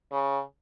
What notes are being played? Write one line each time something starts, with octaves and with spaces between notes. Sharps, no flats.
C#3